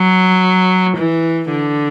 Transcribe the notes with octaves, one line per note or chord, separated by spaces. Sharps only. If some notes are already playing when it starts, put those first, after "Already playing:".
Already playing: F#3
E3
D3